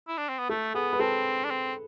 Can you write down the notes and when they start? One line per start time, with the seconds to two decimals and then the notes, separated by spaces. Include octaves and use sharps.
0.08 E4
0.18 D4
0.29 C4
0.39 B3
0.49 A3 A4
0.74 B3 G#4
0.93 B4
1.00 C4 A4
1.45 D4
1.51 C4